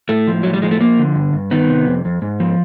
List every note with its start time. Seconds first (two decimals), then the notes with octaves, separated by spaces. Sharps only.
0.09 A2 A3
0.27 F3
0.43 A2 F#3
0.53 G3
0.62 F3 G#3
0.71 A3
0.80 F3 A#3
0.98 D3
1.15 G2
1.33 G2
1.51 D#3 B3
1.69 C3
1.87 F2
2.05 F2
2.22 G#2
2.40 F3